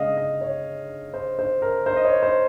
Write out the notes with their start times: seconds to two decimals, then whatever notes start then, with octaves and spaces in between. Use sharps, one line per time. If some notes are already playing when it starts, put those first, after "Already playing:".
Already playing: C#3 G#3 D#5 F5
0.17 D#5
0.41 C#5
1.14 C5
1.39 C5
1.62 A#4
1.86 C5
1.96 D#5
2.05 C#5
2.23 C5